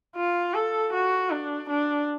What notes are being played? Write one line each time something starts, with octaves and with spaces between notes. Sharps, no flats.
F4
A4
F#4
D4
D4